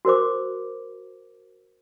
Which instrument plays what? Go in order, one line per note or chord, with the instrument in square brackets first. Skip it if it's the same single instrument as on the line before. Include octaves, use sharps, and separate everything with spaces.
[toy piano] F#4 A#4 C5 D6